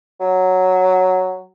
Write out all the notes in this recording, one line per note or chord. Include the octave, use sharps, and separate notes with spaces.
F#3